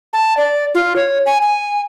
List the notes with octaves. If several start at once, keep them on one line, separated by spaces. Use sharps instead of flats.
A5
D5
F4
C#5
G#5
G#5